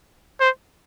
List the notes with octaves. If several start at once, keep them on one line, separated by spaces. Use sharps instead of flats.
C5